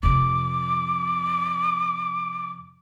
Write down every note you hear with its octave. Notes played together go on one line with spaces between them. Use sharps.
F2 C3 D6